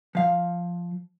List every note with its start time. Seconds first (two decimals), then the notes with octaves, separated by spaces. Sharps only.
0.15 F3 F5